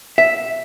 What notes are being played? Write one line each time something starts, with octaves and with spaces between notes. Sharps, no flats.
E5